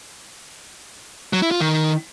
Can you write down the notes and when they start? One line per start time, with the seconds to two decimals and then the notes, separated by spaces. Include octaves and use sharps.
1.33 F#3
1.42 E4
1.51 F4
1.60 D#3